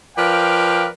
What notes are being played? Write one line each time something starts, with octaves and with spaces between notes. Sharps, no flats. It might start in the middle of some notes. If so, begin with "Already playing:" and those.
F3 A#4 B4 D5 F5 G5